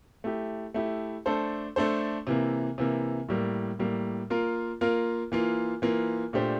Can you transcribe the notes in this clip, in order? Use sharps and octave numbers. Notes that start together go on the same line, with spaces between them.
A3 E4 G4
A3 E4 G4
A3 D4 A4 C5
A3 D4 A4 C5
C3 E3 A#3
C3 E3 A#3
A2 G3 A#3
A2 G3 A#3
A#3 F4 A#4
A#3 F4 A#4
E3 A#3 F4
E3 A#3 F4
A#2 A3 D4 G4 C5